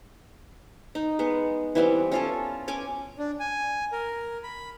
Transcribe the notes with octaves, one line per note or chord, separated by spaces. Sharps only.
D#4
G#3 B3
E3 G3 B3 C4
C#4 F4 A4
C#4 G#5 D6
D4
G#5
A#4
B5